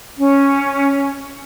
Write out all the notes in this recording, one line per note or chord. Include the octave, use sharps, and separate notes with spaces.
C#4